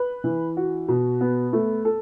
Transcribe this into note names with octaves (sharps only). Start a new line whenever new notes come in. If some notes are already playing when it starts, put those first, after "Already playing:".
Already playing: B4
E3
F#4
B2
B3
A3
A4